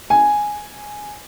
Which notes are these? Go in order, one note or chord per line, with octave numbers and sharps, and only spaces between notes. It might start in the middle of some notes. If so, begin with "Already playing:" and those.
G#5